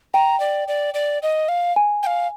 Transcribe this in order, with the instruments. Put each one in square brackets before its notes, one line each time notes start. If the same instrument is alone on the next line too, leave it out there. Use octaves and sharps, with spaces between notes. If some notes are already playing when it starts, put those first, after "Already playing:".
[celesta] G5 [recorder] A#5
[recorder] D5
D5
D5
D#5
F5
[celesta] G#5
[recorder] G5
F5